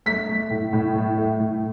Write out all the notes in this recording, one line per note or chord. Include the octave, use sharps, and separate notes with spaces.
A3 B6
A3
A2
A2
A3
A3
A2